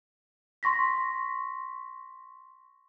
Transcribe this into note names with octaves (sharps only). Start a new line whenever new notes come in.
C6 C#6 A#6 B6